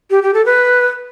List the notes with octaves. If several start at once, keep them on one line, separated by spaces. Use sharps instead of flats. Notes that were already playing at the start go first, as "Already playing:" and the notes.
G4
G4
A4
B4